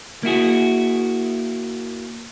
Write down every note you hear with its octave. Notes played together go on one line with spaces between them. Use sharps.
A#3 E4 F#4 G#4